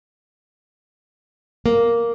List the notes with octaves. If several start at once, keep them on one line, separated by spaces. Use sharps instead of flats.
A#3